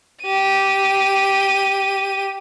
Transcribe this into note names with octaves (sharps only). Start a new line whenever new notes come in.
G4 D#7